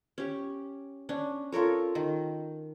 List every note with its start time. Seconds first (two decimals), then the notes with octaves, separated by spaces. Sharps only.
0.18 C#4 G4
1.09 C#4 D4
1.52 F4 A4 A#4 C#5
1.95 D#3